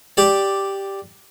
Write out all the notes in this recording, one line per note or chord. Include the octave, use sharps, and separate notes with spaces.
G4 D5